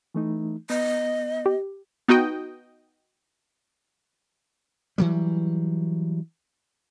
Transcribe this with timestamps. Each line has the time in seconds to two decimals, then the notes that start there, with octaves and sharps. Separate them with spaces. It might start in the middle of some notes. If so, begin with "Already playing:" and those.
0.14 E3 A3 D#4
0.70 B3 D#5
1.46 G4
2.08 B3 D#4 F#4 D#5 G5
4.98 E3 F#3 G3